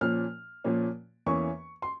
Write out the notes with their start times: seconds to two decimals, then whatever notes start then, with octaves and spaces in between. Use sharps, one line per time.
0.01 A#2 F3 A#3 C#4 F6
0.64 A#2 F3 A#3 C#4
1.26 E2 E3 A#3 C#4 C#6
1.82 C6